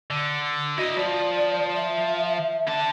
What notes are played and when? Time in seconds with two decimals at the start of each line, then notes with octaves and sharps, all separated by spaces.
0.10 D3
0.77 E4 F#4 D#5
0.97 F3 D5
1.76 E5
2.67 D3 A5